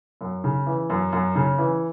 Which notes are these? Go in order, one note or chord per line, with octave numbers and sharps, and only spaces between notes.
F#2
C#3
E3
F#2
F#2
C#3
E3